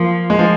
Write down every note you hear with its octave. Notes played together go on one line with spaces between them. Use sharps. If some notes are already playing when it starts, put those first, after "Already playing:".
Already playing: F3 A#3
G#3
F3